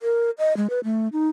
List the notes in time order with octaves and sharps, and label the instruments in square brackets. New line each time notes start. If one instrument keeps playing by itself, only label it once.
[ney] A#4
D#5
G#3
B4
A3
D#4